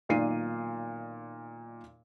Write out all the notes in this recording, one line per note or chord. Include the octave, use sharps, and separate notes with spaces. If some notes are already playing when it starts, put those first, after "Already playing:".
B1 A#2 D#3 D5 C7 D#7